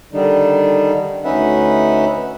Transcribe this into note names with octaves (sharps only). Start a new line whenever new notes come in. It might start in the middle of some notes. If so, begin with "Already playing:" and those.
D3 D#3 G3 D4 D#4
D2 C#4 D#4 B4 E5 F#5